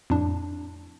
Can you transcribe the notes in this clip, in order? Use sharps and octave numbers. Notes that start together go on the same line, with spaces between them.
F2 A2 D4